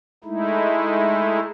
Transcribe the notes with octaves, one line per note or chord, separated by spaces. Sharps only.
G#3 A3 D#4 E4